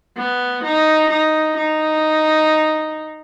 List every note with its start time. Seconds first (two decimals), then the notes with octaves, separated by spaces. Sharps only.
0.17 B3
0.63 D#4
1.10 D#4
1.56 D#4